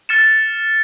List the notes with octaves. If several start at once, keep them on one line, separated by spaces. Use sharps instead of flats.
F6 A6 C#7 E7